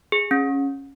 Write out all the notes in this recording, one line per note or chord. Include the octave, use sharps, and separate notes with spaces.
G#4
C#4